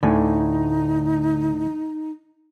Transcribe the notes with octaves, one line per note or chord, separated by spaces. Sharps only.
D2 A2 D3 D#4 G#5